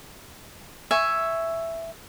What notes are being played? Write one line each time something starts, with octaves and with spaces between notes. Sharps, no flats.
E5 G#5 C#6